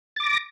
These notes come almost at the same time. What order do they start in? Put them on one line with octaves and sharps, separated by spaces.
A6 D6 A#6